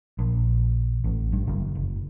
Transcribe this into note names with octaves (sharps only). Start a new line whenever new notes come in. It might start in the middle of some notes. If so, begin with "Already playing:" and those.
A#1
A1
G2
F#1
F#1